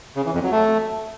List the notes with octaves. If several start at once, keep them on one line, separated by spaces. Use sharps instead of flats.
C#3
E3
F2
F#3
A3